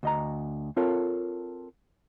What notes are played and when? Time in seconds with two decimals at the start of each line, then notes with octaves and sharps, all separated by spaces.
0.03 D2 D#5 A#5
0.77 C4 F4 A4 A#4 C#5